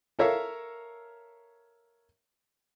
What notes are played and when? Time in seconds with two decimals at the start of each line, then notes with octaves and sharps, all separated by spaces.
0.19 A4 A#4 C#5 E5 F5